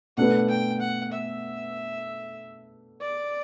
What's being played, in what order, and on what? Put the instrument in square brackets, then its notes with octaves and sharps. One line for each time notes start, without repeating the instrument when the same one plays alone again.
[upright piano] B2 A3 D4 F#4 B4 [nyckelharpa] F#5
[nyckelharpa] G5
F#5
E5
D5